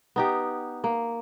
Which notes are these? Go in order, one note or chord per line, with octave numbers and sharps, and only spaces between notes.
B3 D#4 G4
A#3